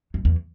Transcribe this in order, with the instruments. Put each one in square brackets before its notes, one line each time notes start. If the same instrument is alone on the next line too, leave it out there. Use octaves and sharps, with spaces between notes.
[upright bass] F#2
E2